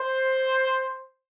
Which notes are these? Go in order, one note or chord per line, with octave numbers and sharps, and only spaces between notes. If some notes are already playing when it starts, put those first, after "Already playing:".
Already playing: C5